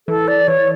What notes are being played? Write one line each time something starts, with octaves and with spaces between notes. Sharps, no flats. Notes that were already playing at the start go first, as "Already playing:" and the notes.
E3 A4
D5
E3 C#5